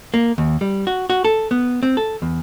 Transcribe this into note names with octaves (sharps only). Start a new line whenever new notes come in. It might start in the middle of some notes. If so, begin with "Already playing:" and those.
A#3
D#2
G3
F#4
F#4
A4
B3
C4
A4
E2